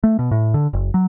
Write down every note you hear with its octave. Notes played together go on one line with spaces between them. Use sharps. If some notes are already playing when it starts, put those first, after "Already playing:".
A3
B2
A2
D3
F#1
F#3